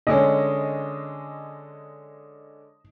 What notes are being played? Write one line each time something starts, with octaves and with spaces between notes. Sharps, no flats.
D3 G#3 C#4 D#5